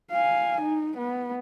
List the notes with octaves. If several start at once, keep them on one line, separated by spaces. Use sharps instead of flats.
F5 G#5
D#4
B3